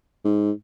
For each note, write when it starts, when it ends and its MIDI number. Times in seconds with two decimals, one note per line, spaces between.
0.25 0.51 44